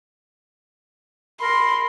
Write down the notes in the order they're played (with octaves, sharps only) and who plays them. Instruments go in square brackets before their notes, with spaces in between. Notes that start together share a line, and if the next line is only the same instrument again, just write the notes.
[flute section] A#4 B5 [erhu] C6